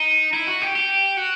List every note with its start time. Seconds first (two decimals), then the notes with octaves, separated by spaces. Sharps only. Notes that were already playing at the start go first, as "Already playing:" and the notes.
Already playing: D#4
0.33 E4
0.47 F#4
0.61 G4
0.76 G4
1.17 F#4